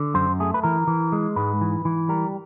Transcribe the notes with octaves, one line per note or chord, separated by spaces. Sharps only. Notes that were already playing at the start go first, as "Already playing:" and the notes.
Already playing: D3
F#2 C5
A3 G#4
B4
E3 A#4
E3
G#3
G#2 B4
E3
E3
G3 A#4